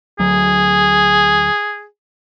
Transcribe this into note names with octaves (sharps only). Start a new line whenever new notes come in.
D2 F#3 G#4